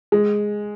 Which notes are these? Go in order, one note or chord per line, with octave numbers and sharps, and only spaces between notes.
G#3